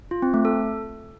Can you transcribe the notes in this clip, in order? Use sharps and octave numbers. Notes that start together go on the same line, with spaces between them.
F4
C4
A3
A4